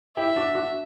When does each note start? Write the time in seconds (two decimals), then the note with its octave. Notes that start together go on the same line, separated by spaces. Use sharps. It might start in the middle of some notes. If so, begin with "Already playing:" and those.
0.17 E4 G4 E5
0.36 D4 F#4
0.55 D4 F#4